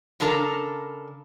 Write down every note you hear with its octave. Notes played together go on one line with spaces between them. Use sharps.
C#3 D4 A4 A#4 A#5